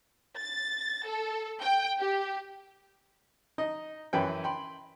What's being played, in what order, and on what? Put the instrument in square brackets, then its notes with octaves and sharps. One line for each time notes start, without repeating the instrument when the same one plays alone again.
[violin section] A6
A4
G5
G4
[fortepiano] D#4 D#5
F#2 E3 C#4 B4 G5
G5 B5 C6